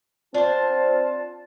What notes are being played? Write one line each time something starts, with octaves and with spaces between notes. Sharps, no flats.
C4 D4 F4 C5 A5